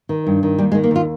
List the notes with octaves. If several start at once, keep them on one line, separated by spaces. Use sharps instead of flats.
D#3
G2
D#3
D#2 G3
G#3
D#3
A#3
D#2 F4